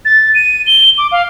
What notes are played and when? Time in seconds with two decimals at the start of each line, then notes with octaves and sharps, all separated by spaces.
0.05 A6
0.35 D#7
0.67 G7
0.98 D6
1.12 F5